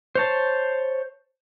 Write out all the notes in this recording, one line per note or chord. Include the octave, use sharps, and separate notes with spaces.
C5 C#5 A5